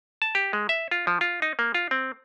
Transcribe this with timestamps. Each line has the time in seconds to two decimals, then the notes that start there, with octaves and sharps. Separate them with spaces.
0.22 A5
0.35 G4
0.53 G#3
0.69 E5
0.91 F4
1.07 F3
1.21 F4
1.42 D#4
1.59 A#3
1.74 F4
1.91 C4